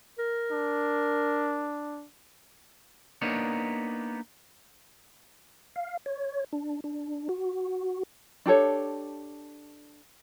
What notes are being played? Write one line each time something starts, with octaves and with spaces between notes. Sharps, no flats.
A#4
D4
A#3 B3 D4 D#4 C#5
F5
C#5
D4
D4
F#4
D4 G4 A4 C#5